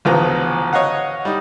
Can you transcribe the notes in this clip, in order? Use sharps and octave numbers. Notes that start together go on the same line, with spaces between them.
A1 D2 C#3 F3 B3 A#5
C#5 D#5 F5 F#5
G3 D#4